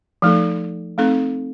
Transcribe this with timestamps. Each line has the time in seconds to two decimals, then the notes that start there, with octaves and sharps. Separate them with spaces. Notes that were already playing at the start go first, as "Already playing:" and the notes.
0.22 F3 A3 D#4 A4
0.98 A3 C4 D#4 A4